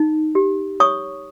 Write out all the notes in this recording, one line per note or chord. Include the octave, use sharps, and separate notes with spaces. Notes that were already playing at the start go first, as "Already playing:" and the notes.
Already playing: D#4
G4
C#5 C#6 D#6